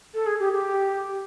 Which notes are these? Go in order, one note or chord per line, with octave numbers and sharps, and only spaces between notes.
A4
G#4
G4
G4